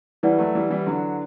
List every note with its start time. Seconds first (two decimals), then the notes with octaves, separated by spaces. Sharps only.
0.23 E3 G3 E4 B4 D5 F#5
0.39 F#3 A3
0.55 E3 G3
0.70 E3 G3
0.87 D3 F#3